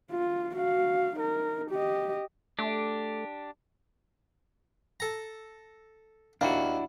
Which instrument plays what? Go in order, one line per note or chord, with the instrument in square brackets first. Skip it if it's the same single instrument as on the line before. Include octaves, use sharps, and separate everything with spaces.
[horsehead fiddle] F4
F#4 F5
D#4 A#4
G4 D#5
[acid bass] A3 [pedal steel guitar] D4 G4
[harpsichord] A4 A#5
[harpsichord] D#2 A#3 [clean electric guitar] D4 E4 F#4